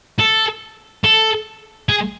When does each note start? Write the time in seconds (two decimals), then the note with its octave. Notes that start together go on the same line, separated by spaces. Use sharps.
0.19 A4
1.04 A4
1.89 G#4